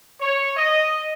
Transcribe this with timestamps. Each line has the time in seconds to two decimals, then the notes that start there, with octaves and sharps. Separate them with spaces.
0.21 C#5
0.57 D#5